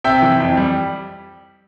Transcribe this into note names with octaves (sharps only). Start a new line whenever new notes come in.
C3 E5 G5
E3
F2
G3